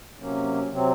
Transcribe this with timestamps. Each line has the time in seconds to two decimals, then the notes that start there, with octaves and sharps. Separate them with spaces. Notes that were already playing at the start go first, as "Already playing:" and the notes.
0.18 C3 F#3 A#3 C#4
0.70 C3 F#3 C4